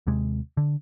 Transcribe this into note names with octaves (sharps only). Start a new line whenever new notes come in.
D#2 C3 G#3
D3